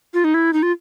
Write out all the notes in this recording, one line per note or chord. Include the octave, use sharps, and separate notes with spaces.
F4
D#4
E4
D#4
F4